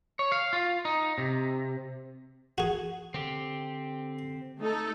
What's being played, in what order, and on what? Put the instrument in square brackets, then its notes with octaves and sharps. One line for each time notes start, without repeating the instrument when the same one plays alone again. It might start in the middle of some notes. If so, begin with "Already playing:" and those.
[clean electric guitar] C#5
F5
F4
D#4
C3
[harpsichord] F#4 G#4
[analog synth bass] D3 [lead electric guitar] C4 G4
[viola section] A3 D#4 A4